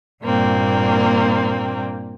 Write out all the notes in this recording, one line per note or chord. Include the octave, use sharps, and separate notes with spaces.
G2 A#2 A#3 C4